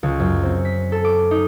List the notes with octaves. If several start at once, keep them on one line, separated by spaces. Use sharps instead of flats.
C#2
F#2
C4
B6
A4
D6
D#4